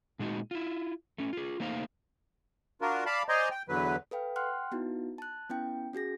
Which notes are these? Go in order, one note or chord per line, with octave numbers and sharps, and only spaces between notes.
A#2 G#3 D#4 F#4
E4 F4
A3 C#4
F4 G#4
A3 A#3 D#4 C5 F5
D4 F4 F#4 A#4
D5 F5 A5 B5
C5 D5 D#5 G#5 A#5 C6
G5
E2 D3 F#3 B4
A4 B4 F5 G5
F#5 G5 C6 F6 F#6
B3 D#4 E4 F#4
A5 F#6
B3 C#4 E4 G5
C#4 F#4 G#4 A#6